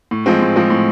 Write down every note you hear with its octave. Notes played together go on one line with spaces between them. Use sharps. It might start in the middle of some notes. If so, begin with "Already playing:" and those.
A2
F3 G#3 C4
A2
F3 G#3 C4
A2